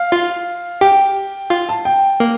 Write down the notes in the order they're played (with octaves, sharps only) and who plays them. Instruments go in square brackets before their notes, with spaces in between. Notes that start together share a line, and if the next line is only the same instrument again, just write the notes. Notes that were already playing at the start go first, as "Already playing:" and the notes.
Already playing: [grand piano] F5
[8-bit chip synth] F4
[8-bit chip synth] G4 [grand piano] G5
[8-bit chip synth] F4
[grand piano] A5
G5
[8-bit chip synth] A#3